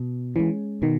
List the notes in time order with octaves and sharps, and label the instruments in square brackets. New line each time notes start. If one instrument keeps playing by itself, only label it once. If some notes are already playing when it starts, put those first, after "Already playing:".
Already playing: [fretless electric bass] B2
[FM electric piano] E3 [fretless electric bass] G#3 C#4
[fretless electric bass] B2 [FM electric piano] D#3